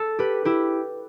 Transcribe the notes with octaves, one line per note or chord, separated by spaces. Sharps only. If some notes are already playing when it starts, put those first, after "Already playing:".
Already playing: A4
G4 B4
E4 G4